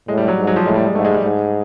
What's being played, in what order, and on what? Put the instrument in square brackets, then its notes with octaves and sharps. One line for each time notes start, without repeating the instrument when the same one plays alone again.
[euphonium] A2 [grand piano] G#3
[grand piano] G3
F#3
[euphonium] G#2
[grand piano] F#3
F3
[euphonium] A2 [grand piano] G#3
[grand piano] G3
G#3
[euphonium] G#2 [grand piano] A3
[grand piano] G#3
G3
[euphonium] G#2 [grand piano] G#3